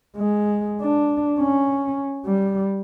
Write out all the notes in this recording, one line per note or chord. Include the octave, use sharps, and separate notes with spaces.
G#3
D4
C#4
G3